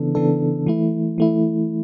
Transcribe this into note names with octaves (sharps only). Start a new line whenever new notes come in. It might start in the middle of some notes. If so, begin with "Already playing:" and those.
Already playing: C#3 E3 B3 D4 A4
C#3 E3 B3 D4 A4
E3 A3 E4
E3 A3 E4